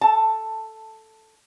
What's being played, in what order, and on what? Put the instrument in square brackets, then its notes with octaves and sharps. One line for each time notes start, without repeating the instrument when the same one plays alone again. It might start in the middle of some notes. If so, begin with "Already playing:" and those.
[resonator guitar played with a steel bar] A4 A5